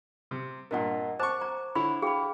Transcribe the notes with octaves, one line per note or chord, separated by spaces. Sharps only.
C3
G2 A#2 A#4 D#5 F#5
C5 A5 C#6 D6
A#5
D3 E4 C#5 B5
G#4 F5 G5 B5